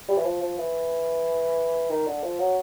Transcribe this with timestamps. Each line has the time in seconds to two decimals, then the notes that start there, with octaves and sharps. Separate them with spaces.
0.08 G3
0.17 E3
0.25 F3
0.42 F3
0.58 E3
1.90 D#3
2.07 D3
2.24 F3
2.40 F#3